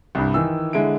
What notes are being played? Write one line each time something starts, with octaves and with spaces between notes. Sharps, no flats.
C2 G2
D#3 E3 E6
D3 G#3 E4 D7